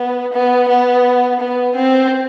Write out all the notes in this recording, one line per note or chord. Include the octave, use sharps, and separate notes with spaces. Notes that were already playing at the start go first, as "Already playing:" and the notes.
Already playing: B3
B3
B3
B3
C4